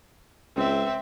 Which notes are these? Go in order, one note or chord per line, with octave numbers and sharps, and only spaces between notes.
C#2 C4 E5